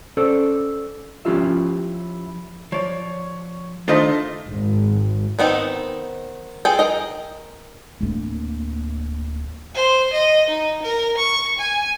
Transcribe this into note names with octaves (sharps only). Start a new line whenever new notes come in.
C#4 A4 C5 D5
F3 C#4 E4 F4 G4 E5
F3 C#5 D5
D#3 A3 D4 F4 A4 C5 D5 D#5
G#1
D#3 B3 C4 D#4
F4 G#4 A4 G5
A#4 D#5
D1 A#3
C5
D#5
D#4
A#4
C#6
G#5